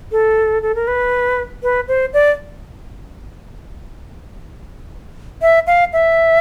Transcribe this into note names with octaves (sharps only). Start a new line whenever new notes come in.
A4
A4
A#4
B4
B4
C5
D5
E5
F5
E5